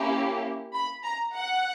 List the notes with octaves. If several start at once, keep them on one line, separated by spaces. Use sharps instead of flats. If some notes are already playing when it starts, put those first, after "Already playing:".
Already playing: A#3 C#4 E4 G4
B5
A#5
F#5